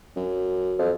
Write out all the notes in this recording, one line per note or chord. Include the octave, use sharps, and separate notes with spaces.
F#2
F2